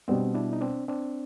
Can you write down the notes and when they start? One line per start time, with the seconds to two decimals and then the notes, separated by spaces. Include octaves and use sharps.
0.08 B2 G3 B3 C4 D4
0.35 D4 E4
0.53 D#4
0.61 C4 D4
0.88 C4 D4